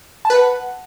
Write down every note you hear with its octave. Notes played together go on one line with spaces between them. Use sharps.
A5
B4
F#5